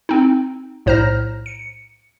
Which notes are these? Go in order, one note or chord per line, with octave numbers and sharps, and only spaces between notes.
C4 D#4
B1 A2 C5 A#5 F6 A#6
C#7